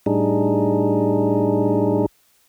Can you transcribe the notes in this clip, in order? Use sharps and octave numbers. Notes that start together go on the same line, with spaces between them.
A2 G3 D4 D#4 G#4